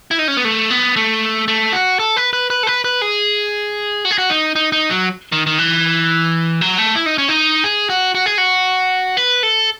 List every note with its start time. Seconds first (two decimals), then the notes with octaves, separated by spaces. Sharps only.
0.11 E4
0.19 D#4
0.28 C#4
0.37 B3
0.45 A3
0.70 B3
0.96 A3
1.48 A3
1.73 F#4
1.99 A4
2.17 B4
2.33 B4
2.50 B4
2.63 A4
2.67 B4
2.84 B4
3.02 G#4
4.05 F#4
4.11 G#4
4.18 F#4
4.30 D#4
4.56 D#4
4.72 D#4
4.90 F#3
5.32 D#3
5.46 D#3
5.59 E3
6.61 F#3
6.78 A3
6.95 E4
7.06 D#4
7.18 C#4
7.28 D#4
7.64 G#4
7.90 F#4
8.15 F#4
8.26 G#4
8.38 F#4
9.17 B4
9.43 A4